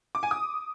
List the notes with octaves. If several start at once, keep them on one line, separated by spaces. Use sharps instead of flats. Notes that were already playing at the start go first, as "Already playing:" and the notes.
D6
G#5
D#6